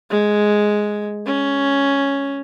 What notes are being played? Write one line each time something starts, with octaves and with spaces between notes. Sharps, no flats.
G#3
C#4